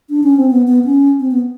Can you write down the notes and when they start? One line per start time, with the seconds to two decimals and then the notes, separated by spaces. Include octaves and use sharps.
0.10 D4
0.23 C#4
0.37 C4
0.50 B3
0.67 B3
0.85 C#4
1.20 C4
1.31 B3